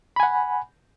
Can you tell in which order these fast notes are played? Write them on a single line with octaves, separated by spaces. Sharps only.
B5 G#5 F#5